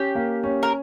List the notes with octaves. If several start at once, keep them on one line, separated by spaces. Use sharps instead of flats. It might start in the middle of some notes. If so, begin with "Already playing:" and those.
Already playing: C#4 G4
A#3
C#4
A#4